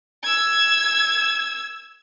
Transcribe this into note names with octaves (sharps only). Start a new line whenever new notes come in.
E6 G#6